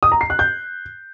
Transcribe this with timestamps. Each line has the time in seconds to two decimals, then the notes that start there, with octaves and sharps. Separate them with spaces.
0.03 D#6
0.12 A#5
0.21 C7
0.30 F#6
0.39 G6